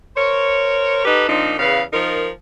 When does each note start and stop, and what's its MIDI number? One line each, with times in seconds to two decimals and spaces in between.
0.17 1.05 70
0.17 1.05 72
0.17 1.05 73
1.05 1.27 63
1.05 1.27 67
1.05 1.27 69
1.05 1.27 71
1.29 1.55 46
1.29 1.55 53
1.29 1.55 60
1.29 1.55 62
1.29 1.55 63
1.59 1.82 40
1.59 1.82 49
1.59 1.82 71
1.59 1.82 77
1.93 2.30 53
1.93 2.30 63
1.93 2.30 65
1.93 2.30 70